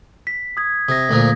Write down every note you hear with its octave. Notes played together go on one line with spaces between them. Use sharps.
B6
D#6 G#6
C3 D#6 A#6
D2 A#2 F3